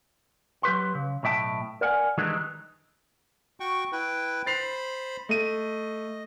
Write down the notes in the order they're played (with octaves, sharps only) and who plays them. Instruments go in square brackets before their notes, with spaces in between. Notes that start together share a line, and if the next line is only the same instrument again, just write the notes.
[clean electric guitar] F#3 G4 B4 C6
C#3
B1 A2 E5 G5 A5
A#4 D5 F#5 G#5
D#3 E3 G3 G#3 D4 D#4
[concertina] F#4 G5 C#6
E4 B4 G5
[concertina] C5 B5 [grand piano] A6 C7 F7
[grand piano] A3 D#7 [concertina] D#5